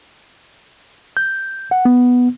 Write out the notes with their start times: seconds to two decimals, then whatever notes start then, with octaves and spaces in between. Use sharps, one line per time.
1.17 G6
1.71 F#5
1.85 B3